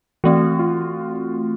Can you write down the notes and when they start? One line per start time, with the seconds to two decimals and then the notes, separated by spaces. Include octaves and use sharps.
0.24 E3 A3 C4 F#4
0.59 F4